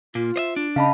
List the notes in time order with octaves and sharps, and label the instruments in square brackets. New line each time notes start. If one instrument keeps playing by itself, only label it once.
[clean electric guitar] A#2 A#3 [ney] F4
[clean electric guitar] C5 D#5 E5
D4
[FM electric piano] C#3 [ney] D#5 [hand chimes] F5 A5 B5